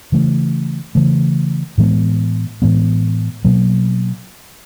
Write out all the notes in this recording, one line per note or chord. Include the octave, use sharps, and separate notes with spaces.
C#3 E3 A3
C#3 E3 A3
A2 E3 G#3 B3
A2 E3 G#3 B3
B2 F#3 A#3